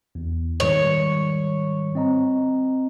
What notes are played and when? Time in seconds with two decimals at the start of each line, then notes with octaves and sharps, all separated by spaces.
0.15 E2
0.60 G#2 D#3 G3 C#5
1.95 C4 D#5 A#5